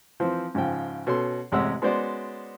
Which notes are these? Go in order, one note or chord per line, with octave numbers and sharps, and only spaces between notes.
E3 F3 C4
G#2 C#3 F3 G5
B2 C#4 A4 C6
A1 C3 G#3 C#5 F#5 E6
G#3 B3 C#4 F#4 C5 D5